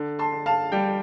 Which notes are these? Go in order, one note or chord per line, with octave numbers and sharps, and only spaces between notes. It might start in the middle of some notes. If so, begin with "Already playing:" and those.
Already playing: D3
A5 C6
D3
F5 A5
G3 G5